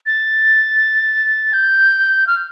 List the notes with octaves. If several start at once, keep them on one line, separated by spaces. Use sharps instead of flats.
A6
G6
F6